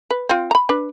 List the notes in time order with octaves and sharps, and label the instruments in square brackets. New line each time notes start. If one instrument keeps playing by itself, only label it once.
[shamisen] B4
C4 F4
A#5 B5
D4 B4